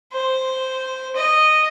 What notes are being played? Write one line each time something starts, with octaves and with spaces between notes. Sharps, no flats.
C5
D#5